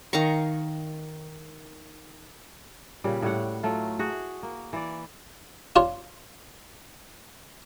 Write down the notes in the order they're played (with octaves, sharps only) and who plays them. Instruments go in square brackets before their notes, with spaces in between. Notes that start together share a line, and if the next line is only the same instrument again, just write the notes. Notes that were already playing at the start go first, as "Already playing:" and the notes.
[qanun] D#3 F5 A#5 C#6
[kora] A#2 C#3 G3
A2 G3 C#5 F#5
F#3 A3 F4
F#4 G#4
A#3
E3 D5
[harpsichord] D4 F4 C#5